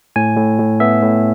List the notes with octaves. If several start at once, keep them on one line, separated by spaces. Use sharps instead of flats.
A2 G#5
A2
A2
B3 E5
A2